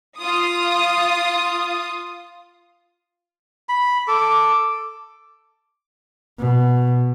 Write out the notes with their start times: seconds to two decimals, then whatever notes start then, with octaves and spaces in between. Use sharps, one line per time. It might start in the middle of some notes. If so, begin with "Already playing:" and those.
0.18 F4 D#6
3.69 B5
4.08 A4 D6
6.39 B2